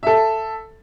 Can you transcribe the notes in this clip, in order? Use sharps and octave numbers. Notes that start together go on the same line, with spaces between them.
A4 E5